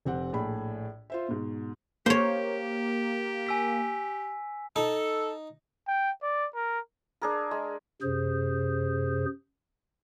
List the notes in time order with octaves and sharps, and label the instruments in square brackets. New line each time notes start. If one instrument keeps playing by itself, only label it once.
[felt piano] F1 C4 G4 F#5
A#1 A2 G#4 B5
F4 C5 E5
G#2 B2
[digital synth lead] A#3 [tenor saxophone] G4 [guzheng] C5 C#5
[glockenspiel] G#5 E6 B6
[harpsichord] D#4 [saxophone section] A4
[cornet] G5
D5
A#4
[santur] D4 G#4 A#4
G#3
[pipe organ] F#2 C3 G#4 C5